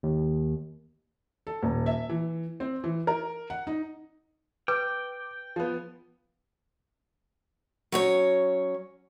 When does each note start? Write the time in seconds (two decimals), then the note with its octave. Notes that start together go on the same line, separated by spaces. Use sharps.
0.03 D#2
1.47 A4
1.62 D#1
1.86 E5
2.09 E3
2.60 C4
2.84 E3
3.07 A#4
3.50 F#5
3.67 D#4
4.68 B4 G5 D6
5.56 F3 B3
7.92 F#3 C#4 C#5